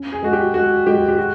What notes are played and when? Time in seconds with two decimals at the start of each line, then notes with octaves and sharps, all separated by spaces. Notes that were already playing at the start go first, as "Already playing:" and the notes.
Already playing: C#4
0.12 G#4
0.22 G#3 F#4
0.33 G4
0.54 G#3 F#4
0.87 G#3 G4
1.08 G4
1.18 F#4